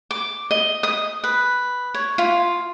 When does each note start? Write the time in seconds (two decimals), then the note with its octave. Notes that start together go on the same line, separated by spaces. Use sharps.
0.11 D6
0.51 D#5
0.83 D#6
1.24 B4
1.94 C#5
2.18 F4